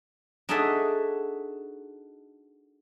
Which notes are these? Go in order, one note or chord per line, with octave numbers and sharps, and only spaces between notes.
D4 D#4 F#4 G#4 A4 E5